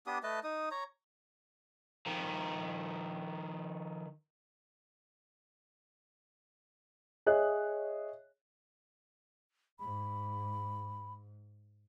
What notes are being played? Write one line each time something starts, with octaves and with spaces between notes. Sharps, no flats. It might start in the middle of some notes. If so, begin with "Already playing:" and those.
B3 D4 G4 D#6
A3 B4 D#5 A5
D#4 D#6
C#5 A#5
D#3 F3
G#4 C#5 D#5 E5 F#6
G#2 B5